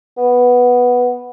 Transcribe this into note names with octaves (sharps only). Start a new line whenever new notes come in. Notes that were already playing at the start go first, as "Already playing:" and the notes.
B3